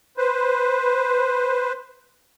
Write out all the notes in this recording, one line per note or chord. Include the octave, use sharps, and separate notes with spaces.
B4 C5